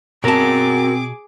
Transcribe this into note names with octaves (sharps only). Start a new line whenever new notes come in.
B2 C4 F#4 G#4 A#4 A5 D6